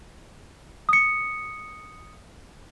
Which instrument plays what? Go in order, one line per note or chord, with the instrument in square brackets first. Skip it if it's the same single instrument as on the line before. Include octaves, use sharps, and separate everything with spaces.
[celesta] D#6 C#7